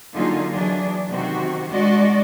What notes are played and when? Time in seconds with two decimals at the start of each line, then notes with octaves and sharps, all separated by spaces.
0.15 D3 F#3 A#3 D#4 F4 G#4
0.53 E3 F#3 D4 G#4
1.10 C3 D#3 C4 F#4
1.70 G#3 D4 F#4 D5 D#5